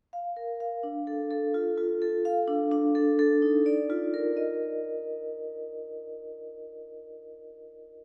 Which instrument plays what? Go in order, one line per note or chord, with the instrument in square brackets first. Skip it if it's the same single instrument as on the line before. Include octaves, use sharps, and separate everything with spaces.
[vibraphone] F5
A#4
F5
D4
A4
A4
F4
F4
A4
F5
D4
D4
A4
A4
D#4
D5
F4
A#4
D#5